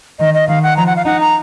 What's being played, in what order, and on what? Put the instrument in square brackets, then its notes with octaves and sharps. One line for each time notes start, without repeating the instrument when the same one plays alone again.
[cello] D#3 [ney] D#5
[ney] D#5
[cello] D#3 [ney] F5
[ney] F#5
[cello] F3 [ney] A#5
[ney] F#5
F5
[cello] D#4 [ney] F#5
[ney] A#5